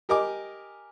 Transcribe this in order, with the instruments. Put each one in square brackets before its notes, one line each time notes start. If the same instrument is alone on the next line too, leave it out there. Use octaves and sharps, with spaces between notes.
[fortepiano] G4 A#4 D#5 G#5 D6